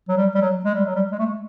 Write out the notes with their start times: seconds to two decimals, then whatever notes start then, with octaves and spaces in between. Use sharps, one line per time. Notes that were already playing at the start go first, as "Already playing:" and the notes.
0.08 F#3
0.17 G3
0.35 G3
0.41 F#3
0.64 G#3
0.75 G3
0.85 F#3
0.95 G3
1.12 G#3
1.19 A3
1.26 G#3